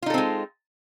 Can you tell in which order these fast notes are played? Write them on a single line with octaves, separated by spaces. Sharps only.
F4 D#4 A4 C4 G#3